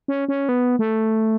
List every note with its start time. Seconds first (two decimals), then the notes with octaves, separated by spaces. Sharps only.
0.08 C#4
0.29 C#4
0.49 B3
0.79 A3